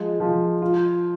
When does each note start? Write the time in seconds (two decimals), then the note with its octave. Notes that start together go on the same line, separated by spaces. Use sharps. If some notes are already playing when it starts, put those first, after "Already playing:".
Already playing: F3 G#3
0.20 F3
0.62 F4